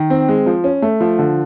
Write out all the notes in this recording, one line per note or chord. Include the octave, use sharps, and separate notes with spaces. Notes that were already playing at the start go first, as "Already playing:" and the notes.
Already playing: D#3
C4
G#3
F3
C#4
A3
F3
D3